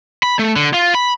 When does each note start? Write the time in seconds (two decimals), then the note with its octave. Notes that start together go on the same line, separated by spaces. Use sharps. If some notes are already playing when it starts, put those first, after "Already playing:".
0.23 B5
0.39 A3
0.56 D3
0.74 F4
0.95 B5